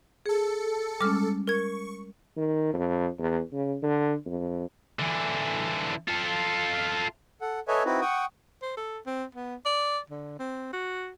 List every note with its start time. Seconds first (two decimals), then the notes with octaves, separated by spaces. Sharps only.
0.26 G#4 A4 C#7
1.01 G3 G#3 C#4 D6 F6
1.47 A#4 C#6 G#6
2.37 D#3
2.74 F2
3.19 E2
3.52 C#3
3.83 D3
4.26 F2
4.99 D3 E3
6.08 F4 A4
7.41 A4 F#5
7.68 A4 B4 C#5 D#5 E5 G#5
7.85 C4 D#4 E4 F#4 B4
8.01 F#5 G5 C#6 D#6
8.62 C5
8.77 A4
9.06 C4
9.35 B3
9.66 D5
10.10 D3
10.39 C4
10.73 F#4